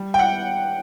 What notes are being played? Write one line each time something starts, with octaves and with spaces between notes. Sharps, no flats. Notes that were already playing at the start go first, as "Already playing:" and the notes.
Already playing: G3
G5
F#5